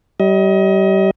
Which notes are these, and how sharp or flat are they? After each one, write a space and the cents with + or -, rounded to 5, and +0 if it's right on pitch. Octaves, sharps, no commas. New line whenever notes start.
G3 -30 D#5 +30